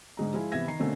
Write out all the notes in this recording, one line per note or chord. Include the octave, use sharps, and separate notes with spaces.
G#2 D3 G#3 A#5
F3 G#3 E4 F4 G#4
C3 E3 B3 E5 G#6 A#6
D#3 A#5 C7
B2 D3 A3 A#3 C4 C#4